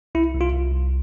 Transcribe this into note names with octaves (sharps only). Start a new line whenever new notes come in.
C2 E4
C2
F4
C2
C2